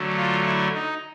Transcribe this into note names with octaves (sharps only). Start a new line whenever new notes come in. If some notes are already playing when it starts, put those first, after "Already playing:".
Already playing: D3 F#3 A3
F4
E4
D#4